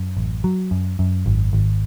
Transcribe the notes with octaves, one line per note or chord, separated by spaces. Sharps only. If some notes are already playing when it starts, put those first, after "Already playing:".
Already playing: F#2
A1
F#3
F#2
F#2
G#1
G#1